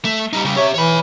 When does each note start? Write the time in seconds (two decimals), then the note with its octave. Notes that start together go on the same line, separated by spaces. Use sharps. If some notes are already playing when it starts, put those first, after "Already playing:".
0.05 A3
0.33 G3 D#4
0.45 C#3 G3
0.57 G4 C#5 E5
0.74 E3 C#5 B5